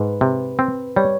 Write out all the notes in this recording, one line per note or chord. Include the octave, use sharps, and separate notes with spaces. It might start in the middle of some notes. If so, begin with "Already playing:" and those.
Already playing: G#2 B4
C3
C4
G3 C#5